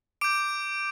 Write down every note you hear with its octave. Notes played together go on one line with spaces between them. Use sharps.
D6 G6 D7